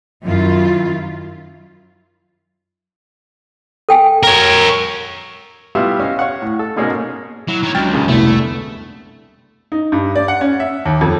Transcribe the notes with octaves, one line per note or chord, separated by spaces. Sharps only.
F#2 D#3 E4 F4
A4 G5 G#5
A#4 C#5
G3 B3 E4 F4 E5 F5
C#4 D#5 F5
C#5 F5 F#5
A2
A4
G#2 B2 G#3 A#3 C#4 D#4
F#3 E4
D#3 C#5
C#2 F#3 D4 G5 F6 A6
D#2 A#2 C#3
F1 C2 D3 A3 B3 E4
D#4
G2
D5
F#5
C#4
E5
D#2
F2